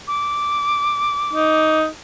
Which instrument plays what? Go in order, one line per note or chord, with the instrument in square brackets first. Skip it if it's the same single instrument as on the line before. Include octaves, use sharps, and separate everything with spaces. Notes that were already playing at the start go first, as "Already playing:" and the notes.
[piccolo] D6
[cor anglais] D#4